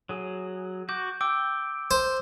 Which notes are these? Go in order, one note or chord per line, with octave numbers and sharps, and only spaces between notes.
F#3 G#4
F#4 D6 G6
G5 D6 E6
C5